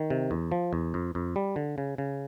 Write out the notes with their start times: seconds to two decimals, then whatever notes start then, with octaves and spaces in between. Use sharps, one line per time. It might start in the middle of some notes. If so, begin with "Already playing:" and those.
Already playing: D#3
0.10 C3
0.31 E2
0.52 F3
0.73 E2
0.94 F2
1.15 F2
1.36 G3
1.56 D3
1.78 C#3
1.98 C#3